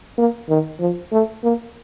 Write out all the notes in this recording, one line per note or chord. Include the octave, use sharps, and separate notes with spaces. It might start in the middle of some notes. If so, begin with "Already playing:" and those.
A#3
D#3
F3
A3
A#3